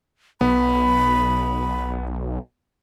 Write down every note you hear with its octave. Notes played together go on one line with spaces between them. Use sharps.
B1 B3 B5